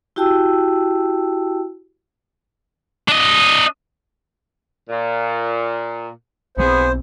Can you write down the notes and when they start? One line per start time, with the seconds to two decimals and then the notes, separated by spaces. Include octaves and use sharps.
0.16 E4 F#4 G4 G5 A5 E6
3.08 D4 D#5
4.89 A#2
6.57 B1 F#3 B3 C4 E4 G#4 C5